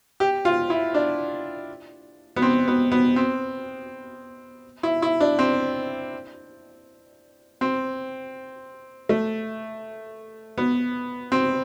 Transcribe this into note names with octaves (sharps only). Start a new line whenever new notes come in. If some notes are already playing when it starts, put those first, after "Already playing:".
G4
F4
E4
D4
B3
C4
B3
B3
C4
E4
E4
D4
C4
C4
A3
B3
C4